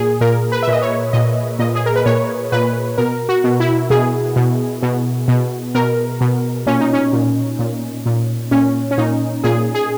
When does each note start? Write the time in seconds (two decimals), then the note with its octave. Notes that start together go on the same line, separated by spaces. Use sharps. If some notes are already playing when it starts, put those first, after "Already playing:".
Already playing: A#2 G#4
0.21 A#2 A#4
0.52 B4
0.63 E5
0.68 A#2 D#5
0.82 C#5
1.13 A#2 D#5
1.59 A#2 D#5
1.75 G#4
1.86 A#4
1.96 B4
2.06 A#2 C#5
2.52 A#2 B4
2.98 B2 A#4
3.29 F#4
3.44 B2
3.60 E4
3.90 B2 G#4
4.36 B2
4.83 B2
5.28 B2
5.75 B2 A#4
6.21 B2
6.66 A#2 C#4
6.80 D#4
6.93 C#4
7.13 A#2
7.59 A#2
8.06 A#2
8.51 A#2 C#4
8.91 C#4
8.98 A#2 D#4
9.44 A#2 G#4
9.75 G#4